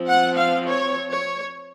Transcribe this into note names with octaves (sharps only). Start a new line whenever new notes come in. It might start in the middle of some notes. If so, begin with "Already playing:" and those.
Already playing: F3 C4
F#5
F5
C#5
C#5